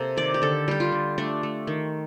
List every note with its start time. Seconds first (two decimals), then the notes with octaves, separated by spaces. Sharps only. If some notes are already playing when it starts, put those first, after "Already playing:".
Already playing: C3 A#3 A4
0.17 D#3 D5
0.34 G4
0.42 D3 A4
0.68 G3 G4
0.80 F4
0.92 D3
1.18 A3 D4
1.43 A3
1.67 D#3